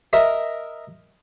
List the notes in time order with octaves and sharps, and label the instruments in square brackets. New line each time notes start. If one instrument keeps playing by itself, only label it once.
[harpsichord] A#4 D#5 E5